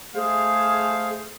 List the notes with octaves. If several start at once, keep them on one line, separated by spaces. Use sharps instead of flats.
A3 G#4 C5 F5